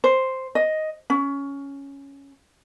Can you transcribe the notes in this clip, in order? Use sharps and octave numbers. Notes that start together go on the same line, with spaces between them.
C5
D#5
C#4